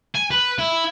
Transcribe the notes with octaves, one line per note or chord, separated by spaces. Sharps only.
G#5
B4
E4